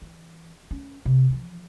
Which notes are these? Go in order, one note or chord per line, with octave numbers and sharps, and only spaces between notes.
E3
C#4
C3
E3 F3